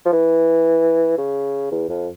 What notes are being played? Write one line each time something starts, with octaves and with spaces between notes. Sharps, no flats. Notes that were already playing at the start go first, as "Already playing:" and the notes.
F3
E3
C#3
E2
F2